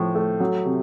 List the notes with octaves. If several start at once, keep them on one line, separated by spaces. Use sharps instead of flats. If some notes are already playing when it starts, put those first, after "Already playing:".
Already playing: A2 F3
A3
F#3
C3